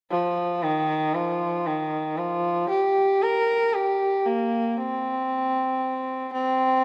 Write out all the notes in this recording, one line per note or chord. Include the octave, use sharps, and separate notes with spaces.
F3
D#3
F3
D#3
F3
G4
A#4
G4
A#3
C4
C4